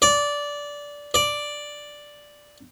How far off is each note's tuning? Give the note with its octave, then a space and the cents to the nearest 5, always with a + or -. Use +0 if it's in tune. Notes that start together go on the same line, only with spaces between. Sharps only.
D5 -15
D5 +0